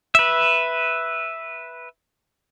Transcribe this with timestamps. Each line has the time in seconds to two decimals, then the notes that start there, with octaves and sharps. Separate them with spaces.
0.15 B4 E5